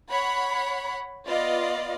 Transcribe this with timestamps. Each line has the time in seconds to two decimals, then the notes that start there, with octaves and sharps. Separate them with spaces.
0.10 C#5 F#5 B5
1.26 B3 F4 D5 D#5